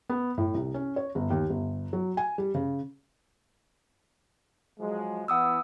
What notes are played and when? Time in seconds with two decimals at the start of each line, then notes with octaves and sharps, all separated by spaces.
0.10 B3
0.38 A2
0.54 C2
0.74 C#4
0.96 C#5
1.15 G1
1.30 D#2
1.50 G1
1.93 F#3
2.17 G#5
2.38 G3
2.55 C#3
4.79 F3 F#3 G#3
5.28 E3 B3 F#5 D#6 E6